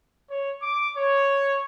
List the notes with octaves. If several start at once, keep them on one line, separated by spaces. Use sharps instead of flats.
C#5
D6
C#5